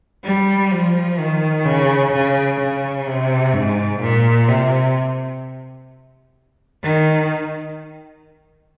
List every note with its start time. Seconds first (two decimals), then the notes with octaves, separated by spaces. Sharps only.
0.24 G3
0.71 F3
1.18 D#3
1.65 C#3
2.12 C#3
2.59 C#3
3.06 C3
3.53 G#2
4.00 A#2
4.48 C3
6.83 D#3